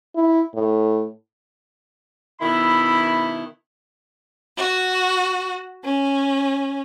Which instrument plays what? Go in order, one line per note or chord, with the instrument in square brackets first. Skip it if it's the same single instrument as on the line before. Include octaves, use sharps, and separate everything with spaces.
[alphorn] E4
A2
[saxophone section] B2 D#3 E4 [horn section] B5
[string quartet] F#4
C#4